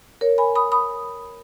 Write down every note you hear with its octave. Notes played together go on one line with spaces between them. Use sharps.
A#4 C#5
G#5 B5
B5 D#6
B5 D#6